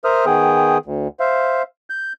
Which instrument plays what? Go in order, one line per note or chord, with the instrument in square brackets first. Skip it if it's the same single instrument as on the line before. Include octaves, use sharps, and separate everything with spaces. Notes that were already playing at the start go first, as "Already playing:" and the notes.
[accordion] A#4 C5 E5 D#6 F6
D#3 B3 G#4 G5 D#6
D2
C5 E5 F5
G6